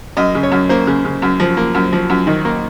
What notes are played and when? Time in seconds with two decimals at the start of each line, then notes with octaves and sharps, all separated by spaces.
0.17 F#2 D#5
0.35 C#3
0.43 C#5
0.51 F#2
0.69 A#3 C5
0.87 C#3
1.05 C#3
1.22 F#2
1.40 F3
1.57 A#3
1.74 F#2
1.93 F3
2.09 F#2
2.27 D#3
2.45 A#3